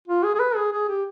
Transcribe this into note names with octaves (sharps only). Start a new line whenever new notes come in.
F4
G#4
G#4
B4
G#4
G#4
G4